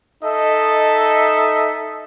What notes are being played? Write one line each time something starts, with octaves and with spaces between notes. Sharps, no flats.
D#4 A4 D#5 E5